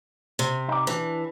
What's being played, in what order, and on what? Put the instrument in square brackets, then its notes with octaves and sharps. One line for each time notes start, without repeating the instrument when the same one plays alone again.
[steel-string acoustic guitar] C3
[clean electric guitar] D#4 D5
[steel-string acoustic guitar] E3 [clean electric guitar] D4